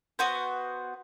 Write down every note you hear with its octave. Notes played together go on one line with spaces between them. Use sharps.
B3 F#4 C5